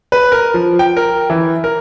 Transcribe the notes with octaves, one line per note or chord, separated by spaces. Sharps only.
B4
A#4
F3
G5
A#4
E3
A#4